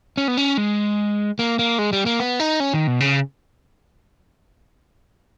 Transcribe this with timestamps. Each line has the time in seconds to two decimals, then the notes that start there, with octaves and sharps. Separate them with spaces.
0.17 C#4
0.28 B3
0.38 C#4
0.57 G#3
1.39 A#3
1.59 A#3
1.79 G#3
1.93 G3
2.06 A#3
2.20 B3
2.40 D#4
2.60 C#4
2.74 D#3
2.87 B2
3.00 C#3